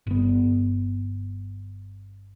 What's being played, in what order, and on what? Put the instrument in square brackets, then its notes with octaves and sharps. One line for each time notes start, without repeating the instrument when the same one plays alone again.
[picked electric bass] G1 B3